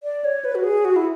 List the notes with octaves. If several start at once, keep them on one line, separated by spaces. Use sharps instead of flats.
D5
C#5
B4
F#4
G#4
F#4
E4